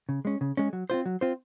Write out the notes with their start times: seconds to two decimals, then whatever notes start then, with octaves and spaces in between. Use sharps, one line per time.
0.09 C#3
0.25 G#3 C#4
0.41 C#3
0.57 G#3 C#4
0.73 F#3
0.90 C4 F4 C5
1.06 F#3
1.21 C4 F4 C5